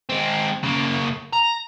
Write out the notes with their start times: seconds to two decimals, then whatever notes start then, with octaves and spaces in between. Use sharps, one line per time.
0.09 G#3 C4
0.63 C#3 A#3
1.33 A#5